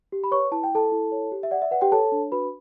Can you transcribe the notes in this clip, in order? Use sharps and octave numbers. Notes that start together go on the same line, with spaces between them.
G4
B5
B4 C#5 C#6
E4 A5
G5
E4 A4 A5
E4
C#5
G4
E5
D5 F#5
E5
B4 F#5
G4 G5
A4 C#5 A5
D4
F#4 B4 B5